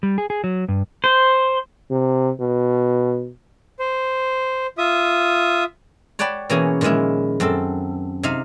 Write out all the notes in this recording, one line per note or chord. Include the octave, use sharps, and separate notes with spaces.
G3
G#4
G#4
F#3
G2
C5
C3
B2
C5
F4 E5 D#6
C#5 D5 F#5 G5 A5 B5
B2 E3 A#3 C#4 G#4
A#2 D#3 F3 G#3 E4
F#2 C4 A4
C3 D#4 F5